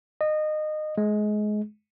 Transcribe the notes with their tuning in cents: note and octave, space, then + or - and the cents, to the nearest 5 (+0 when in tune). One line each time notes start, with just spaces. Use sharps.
D#5 -20
G#3 +25